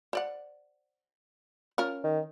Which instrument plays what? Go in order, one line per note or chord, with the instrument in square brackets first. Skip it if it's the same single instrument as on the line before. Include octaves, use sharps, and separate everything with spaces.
[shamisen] C5 D5 F#5
C#4 F4 A#4
[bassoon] D#3